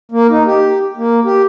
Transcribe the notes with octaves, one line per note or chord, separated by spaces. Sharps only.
A#3
D#4
G4
A#3
G4